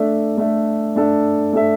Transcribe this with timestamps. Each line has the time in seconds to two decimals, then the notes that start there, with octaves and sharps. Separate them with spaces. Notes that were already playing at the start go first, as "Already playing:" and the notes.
Already playing: A3 D4 A4 E5
0.38 A3 D4 A4 E5
0.95 A3 D4 A4 E5
1.53 A3 D4 A4 E5